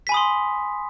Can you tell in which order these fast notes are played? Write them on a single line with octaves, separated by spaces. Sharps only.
B6 G#5 B5 D#6 C6